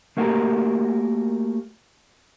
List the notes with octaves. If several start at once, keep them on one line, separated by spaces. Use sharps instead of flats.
A3 A#3 F#4 G4 A4 A#4